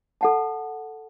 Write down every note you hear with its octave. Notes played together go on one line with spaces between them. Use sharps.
A4 F#5 A5